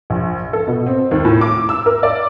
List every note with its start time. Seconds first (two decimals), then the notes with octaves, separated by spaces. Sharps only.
0.10 A#1
0.53 A4
0.68 B2
0.86 C4
1.11 D#2
1.25 A2
1.41 D6
1.69 E6
1.86 A#4
2.03 D5